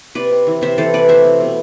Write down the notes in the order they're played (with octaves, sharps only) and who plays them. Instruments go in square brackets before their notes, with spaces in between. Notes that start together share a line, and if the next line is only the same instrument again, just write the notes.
[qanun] C3 B4 D5
C3
E3
C3 C5 E5
E3 A4 C5
C3 B4 D5
A3 C5 E5
C4
B2